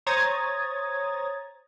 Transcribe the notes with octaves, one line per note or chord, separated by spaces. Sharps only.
C5 C#5 A#5 D#6 G#6 A6